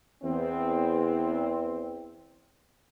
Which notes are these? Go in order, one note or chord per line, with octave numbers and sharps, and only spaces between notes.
E2 C4